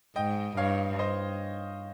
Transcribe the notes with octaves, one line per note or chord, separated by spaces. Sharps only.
G#2 D#5 G5
G2 C#5 F5
C5 D#5